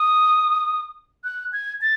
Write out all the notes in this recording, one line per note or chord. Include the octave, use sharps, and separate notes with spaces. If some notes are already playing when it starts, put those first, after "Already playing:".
Already playing: D#6
F#6
G#6
A6